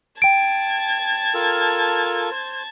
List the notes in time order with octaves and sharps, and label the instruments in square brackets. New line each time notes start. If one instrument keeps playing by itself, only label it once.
[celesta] G5 D7 [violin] A5 G#6
[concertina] F4 A4 A#4
C5